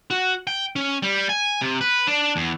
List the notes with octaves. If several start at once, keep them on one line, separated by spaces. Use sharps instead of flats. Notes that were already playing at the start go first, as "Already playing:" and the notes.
F#4
G5
C#4
G3
G#5
C3
B4
D4
E2